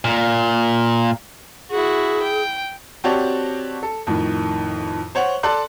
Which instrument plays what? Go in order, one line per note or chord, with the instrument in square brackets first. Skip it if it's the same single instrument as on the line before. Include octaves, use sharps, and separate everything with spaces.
[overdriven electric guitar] A#2
[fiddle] E4 F#4 [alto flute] G#4
[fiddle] G5
[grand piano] C4 F#4 G4 C#5 D5 A5
A4
F2 A2 D#3
C5 C#5 F#5
A4 D5 A5 C6 F#6